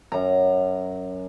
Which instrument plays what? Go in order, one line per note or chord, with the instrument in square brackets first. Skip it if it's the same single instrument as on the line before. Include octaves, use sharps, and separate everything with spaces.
[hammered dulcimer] F#2 A#5